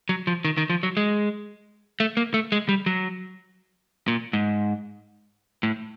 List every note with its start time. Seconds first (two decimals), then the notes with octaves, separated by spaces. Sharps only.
0.09 F#3
0.27 F3
0.45 D#3
0.57 D#3
0.70 F3
0.83 F#3
0.97 G#3
2.00 A3
2.17 A#3
2.34 A3
2.52 G#3
2.69 G3
2.86 F#3
4.08 A#2
4.33 G#2
5.63 A2